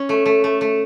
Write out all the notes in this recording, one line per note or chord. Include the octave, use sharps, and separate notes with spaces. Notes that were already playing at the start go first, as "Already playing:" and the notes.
Already playing: C#4
A3
A3
A3
A3